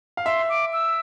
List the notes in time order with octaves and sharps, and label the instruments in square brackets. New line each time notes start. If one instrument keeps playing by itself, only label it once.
[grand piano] F5
[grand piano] E5 [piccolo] C6
[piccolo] D6
E6